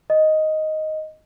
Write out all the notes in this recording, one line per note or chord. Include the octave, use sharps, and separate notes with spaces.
D#5